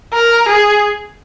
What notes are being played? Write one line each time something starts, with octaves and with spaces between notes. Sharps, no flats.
A#4
G#4